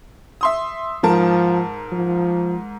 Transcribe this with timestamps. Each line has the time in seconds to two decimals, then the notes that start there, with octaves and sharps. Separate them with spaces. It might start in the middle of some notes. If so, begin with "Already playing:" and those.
0.41 E5 C6 D#6
1.03 G#2 F3 A#4 A5
1.92 F3